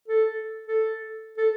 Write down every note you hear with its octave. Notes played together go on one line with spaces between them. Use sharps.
A4
A4
A4